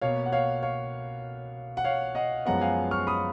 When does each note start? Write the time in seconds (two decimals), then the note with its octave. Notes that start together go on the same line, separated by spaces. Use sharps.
0.02 B2 A#3 C#5 F5
0.26 F#5
0.32 C#5 F5
0.63 C#5 F5
1.77 F#5
1.84 C#5 F5
2.15 D#5 F#5
2.45 F#2 F3 G#3 B3 F#5 A#5
2.61 F5 G#5
2.91 C#6 F6
3.07 B5 D#6